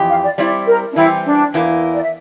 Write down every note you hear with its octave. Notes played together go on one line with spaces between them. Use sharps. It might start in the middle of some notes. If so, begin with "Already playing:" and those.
Already playing: F2 E3 G4
F5
D5
G3 C4 E4 D5
A#4
D4
E3 G3 C4 E4
D4
E2 E3 A#3
D5
E5